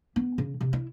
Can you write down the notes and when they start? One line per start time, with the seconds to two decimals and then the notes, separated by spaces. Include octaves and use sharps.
0.16 B3
0.38 C#3
0.61 C3
0.73 E4